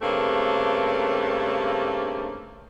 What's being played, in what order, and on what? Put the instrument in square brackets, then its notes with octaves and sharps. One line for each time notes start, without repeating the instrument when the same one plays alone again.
[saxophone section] G2 C#3 A3 A#3 C4